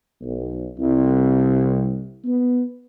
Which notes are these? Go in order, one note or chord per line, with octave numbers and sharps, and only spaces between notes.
B1
C2
B3